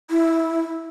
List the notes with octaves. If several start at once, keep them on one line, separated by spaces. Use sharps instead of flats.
E4